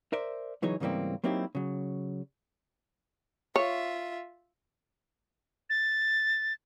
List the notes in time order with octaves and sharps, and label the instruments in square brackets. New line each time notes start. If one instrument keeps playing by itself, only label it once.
[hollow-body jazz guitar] A#4 C5 D5 E5
C#2 E3 F#3 D#4 G#4 C#5
G#2 C#3 E3 G3 A#3 C4
F#3 A#3 C4 D#4 E4 G4
C#3 F#3
[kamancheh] F4 E5 [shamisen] C#5
[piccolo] A6